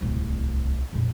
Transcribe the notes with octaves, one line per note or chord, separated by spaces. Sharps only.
D1 C2
A#1 F2